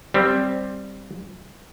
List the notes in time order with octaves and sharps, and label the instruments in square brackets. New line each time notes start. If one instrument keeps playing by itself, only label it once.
[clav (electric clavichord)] G3 C4